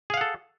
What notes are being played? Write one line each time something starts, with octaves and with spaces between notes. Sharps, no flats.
G#4 A4 F5 F#5